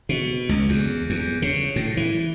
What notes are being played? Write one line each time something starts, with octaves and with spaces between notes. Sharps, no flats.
B2
C#2
E2
E2
C#3
A2
E3